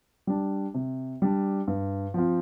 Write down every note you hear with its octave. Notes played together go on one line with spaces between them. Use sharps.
G3 D4
C3
G3 D4
G2
F3 C4 F4